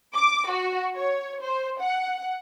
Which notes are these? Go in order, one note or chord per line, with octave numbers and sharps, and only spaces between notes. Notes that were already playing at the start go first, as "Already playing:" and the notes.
D6
F#4
C#5
C5
F#5